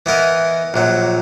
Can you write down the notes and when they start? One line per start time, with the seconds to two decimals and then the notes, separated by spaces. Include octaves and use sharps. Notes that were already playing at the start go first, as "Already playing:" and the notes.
0.06 E3 B3 E4 A#4 D#5
0.74 A#1 A#2 F#3